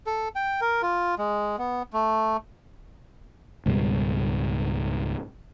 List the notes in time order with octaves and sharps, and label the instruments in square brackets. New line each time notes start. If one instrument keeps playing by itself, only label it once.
[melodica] A4
G5
A#4
F4
G#3
B3
A3
[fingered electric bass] C#2 G#2 B2 G3